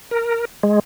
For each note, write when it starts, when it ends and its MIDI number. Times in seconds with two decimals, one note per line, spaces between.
0.11 0.45 70
0.63 0.80 56